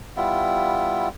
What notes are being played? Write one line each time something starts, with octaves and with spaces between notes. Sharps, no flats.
G3 B3 E4 F4